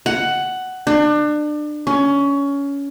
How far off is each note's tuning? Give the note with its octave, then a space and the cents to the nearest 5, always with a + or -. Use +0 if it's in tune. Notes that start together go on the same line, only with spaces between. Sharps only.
F#5 +10
D4 +30
C#4 +20